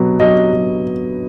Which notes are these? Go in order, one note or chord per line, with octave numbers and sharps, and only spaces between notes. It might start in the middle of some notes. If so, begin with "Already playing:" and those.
Already playing: B2 F#3
F#3 D#5
F#3